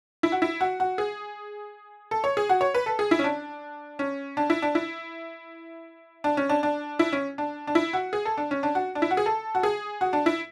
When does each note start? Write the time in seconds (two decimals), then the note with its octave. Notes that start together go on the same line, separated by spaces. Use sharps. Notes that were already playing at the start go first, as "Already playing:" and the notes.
0.23 E4
0.32 F#4
0.42 E4
0.61 F#4
0.80 F#4
0.98 G#4
2.11 A4
2.24 C#5
2.37 G#4
2.49 F#4
2.61 C#5
2.74 B4
2.86 A4
2.99 G#4
3.11 E4
3.19 C#4
3.24 D4
3.99 C#4
4.37 D4
4.50 E4
4.62 D4
4.75 E4
6.24 D4
6.37 C#4
6.49 D4
6.63 D4
6.99 E4
7.13 C#4
7.38 D4
7.67 D4
7.75 E4
7.93 F#4
8.13 G#4
8.25 A4
8.37 D4
8.51 C#4
8.63 D4
8.75 F#4
8.95 D4
9.02 E4
9.11 F#4
9.17 G#4
9.26 A4
9.55 F#4
9.63 G#4
10.01 F#4
10.13 D4
10.26 E4